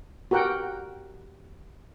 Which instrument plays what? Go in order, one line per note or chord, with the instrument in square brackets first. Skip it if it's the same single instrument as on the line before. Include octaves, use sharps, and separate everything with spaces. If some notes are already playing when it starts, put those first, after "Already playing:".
[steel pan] F#4 G4 A#4 F#5 G5